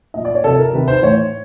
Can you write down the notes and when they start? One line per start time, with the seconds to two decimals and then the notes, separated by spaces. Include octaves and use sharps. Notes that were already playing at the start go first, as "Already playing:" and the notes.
0.14 A#2 F3 D#5
0.25 D5
0.35 C#5
0.44 C3 F3 A4
0.59 A#4
0.73 C3 D#3 B4
0.88 C5
1.02 A2 E3 C#5